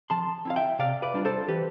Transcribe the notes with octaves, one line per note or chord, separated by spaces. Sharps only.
F3 A5 C6
C4 E4 F5
E5 G5
C3 D5 F5
B4 D5
G3 D4 F4
A4 C5
E3 G4 B4